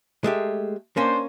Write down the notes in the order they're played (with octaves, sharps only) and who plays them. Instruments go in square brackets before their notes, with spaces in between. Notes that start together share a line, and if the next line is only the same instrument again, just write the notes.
[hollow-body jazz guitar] G#3 A3 G4
[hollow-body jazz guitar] A#3 C#4 [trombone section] D4 C5